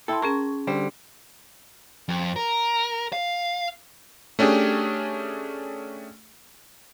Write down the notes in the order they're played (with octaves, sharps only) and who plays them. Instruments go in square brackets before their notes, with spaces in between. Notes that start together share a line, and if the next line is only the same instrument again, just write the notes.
[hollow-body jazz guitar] E4 A4 [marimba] G5 A5 C6
[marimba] C#4 G#4 C#6 [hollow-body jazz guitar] A#4
[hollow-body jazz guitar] D3 G3 C5
[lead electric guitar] F2
A#4
F5
[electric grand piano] A3 C#4 D4 G4 G#4